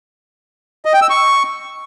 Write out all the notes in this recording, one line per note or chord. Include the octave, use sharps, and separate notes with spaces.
D#5
G5
E6
C#6